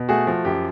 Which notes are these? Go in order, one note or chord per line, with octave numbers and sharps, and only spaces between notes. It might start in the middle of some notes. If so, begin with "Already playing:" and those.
Already playing: B2
A3 F#4 G#4
F3 F#4
F#2 G4